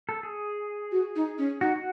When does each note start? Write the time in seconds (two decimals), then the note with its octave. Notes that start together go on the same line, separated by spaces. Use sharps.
0.09 A4
0.23 G#4
0.92 F#4
1.16 D#4
1.38 C#4
1.61 D#4 F#4
1.76 F#4